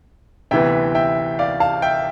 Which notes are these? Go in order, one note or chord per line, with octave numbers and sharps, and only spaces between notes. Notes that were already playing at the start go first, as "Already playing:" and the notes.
D2 C3 E3 B3 E5 G5
E5 G5
D5 F5
F5 A5
E5 G5